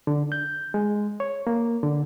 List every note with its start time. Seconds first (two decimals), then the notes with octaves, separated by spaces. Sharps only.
0.07 D3
0.32 G6
0.74 G#3
1.20 C#5
1.47 A#3
1.83 D3